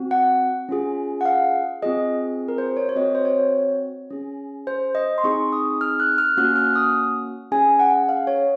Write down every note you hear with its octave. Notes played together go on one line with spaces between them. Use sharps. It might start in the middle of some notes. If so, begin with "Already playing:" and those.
Already playing: C4 F#4
F#5
C#4 F4 G#4
F#5
F5
C4 F4 G#4 D#5
A#4
C5
C#5
C#5
C4 F#4 D#5
C5
C#5
C#4 G#4
C5
D#5
C6
C4 D#4 G#4 C#6
D#6
F6
F#6
F6
A#3 C#4 F#4 F#6
F6
D#6
C#4 G#4 G#5
F#5
F5
C#5